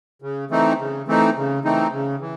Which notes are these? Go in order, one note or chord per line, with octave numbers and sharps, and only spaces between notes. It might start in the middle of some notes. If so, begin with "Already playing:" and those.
C#3
E3 A3 C4 D#4
C#3
E3 A3 C4 D#4
C#3
E3 A3 C4 D#4
C#3
E3